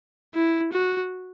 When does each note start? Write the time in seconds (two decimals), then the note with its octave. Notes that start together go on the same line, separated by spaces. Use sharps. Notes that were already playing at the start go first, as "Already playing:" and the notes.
0.34 E4
0.73 F#4